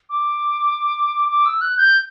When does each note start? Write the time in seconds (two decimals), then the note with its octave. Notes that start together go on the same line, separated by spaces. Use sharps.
0.09 D6
1.29 D6
1.45 E6
1.61 F#6
1.77 G6